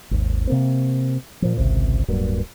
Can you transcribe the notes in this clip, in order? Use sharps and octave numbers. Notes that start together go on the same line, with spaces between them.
G#1 D#2
C3 A#3 C4
A#2 F3
G#1 C#2 C3
D1 G2 F#3 A#3